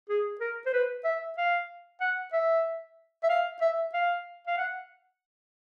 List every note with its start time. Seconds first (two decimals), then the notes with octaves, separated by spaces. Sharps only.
0.09 G#4
0.40 A#4
0.66 C5
0.73 B4
1.04 E5
1.37 F5
2.01 F#5
2.33 E5
3.23 E5
3.29 F5
3.61 E5
3.94 F5
4.47 F5
4.57 F#5